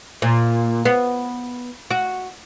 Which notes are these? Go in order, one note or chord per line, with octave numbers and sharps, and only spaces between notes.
A#2
B3
F#4